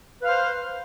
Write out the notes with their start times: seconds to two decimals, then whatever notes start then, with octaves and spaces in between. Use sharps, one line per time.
0.20 B4
0.24 F5
0.29 C5